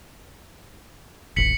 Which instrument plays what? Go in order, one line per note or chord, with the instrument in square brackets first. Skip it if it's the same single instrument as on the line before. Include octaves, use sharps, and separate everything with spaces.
[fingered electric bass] D#1 A1 [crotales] B6 C#7 F#7